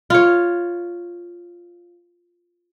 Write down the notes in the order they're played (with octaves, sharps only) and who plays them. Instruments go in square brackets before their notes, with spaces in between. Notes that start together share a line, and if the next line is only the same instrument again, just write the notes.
[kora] F4 C#5